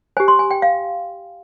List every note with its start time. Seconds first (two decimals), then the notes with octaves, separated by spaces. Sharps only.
0.17 G4 C5 G#5
0.28 C6
0.39 G#5
0.51 G5
0.62 F5